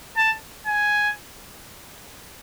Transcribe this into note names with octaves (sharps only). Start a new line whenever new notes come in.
A5
G#5